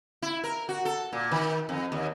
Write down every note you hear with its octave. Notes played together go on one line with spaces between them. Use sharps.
E4
A#4
F#4
A4
A#2
D#3
F2
D#2